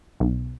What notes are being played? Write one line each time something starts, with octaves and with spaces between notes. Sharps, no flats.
B1